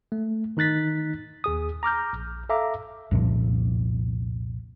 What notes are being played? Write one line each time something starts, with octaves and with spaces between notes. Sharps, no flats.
A3
D#3 D#4 F#6 A6 B6
D#2 G#4 D#6
A#5 D6 F6 G6
A#1
A4 E5 F5 A#5 D6
C2 F2 A#2 F3